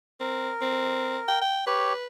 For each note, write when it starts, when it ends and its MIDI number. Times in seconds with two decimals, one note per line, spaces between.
0.20 0.51 60
0.20 1.41 70
0.61 1.18 60
1.28 1.38 79
1.42 1.63 79
1.67 1.93 67
1.67 2.06 71
1.67 1.93 73